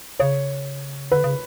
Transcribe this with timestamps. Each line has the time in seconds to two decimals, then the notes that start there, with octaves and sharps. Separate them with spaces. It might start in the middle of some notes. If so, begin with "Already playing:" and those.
0.19 C#3 C#5
1.11 D3 B4
1.24 C#3